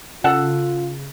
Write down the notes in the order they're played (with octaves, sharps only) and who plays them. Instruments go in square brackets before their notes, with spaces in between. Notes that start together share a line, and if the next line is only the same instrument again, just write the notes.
[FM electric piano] C#3 [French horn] F4 [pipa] A4 F#5